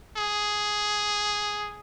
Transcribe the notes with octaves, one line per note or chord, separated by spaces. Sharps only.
G#4